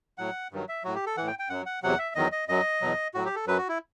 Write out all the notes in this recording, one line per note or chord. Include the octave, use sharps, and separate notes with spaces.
A2 F#3 F#5
G2 D#3 F#3
E5
A2 F#3 F#4
G4
A4
A2 E3 F#5
G5
G5
F#2 F#3 F#5
F#5
E2 C3 F#3 F#5
E5
E2 D#3 F#3 D#5
D#5
F#2 F#3 D#5
E2 B2 F#3
A2 F#3 F#4
G4
A4
F#2 F#3 B4
F#4
E4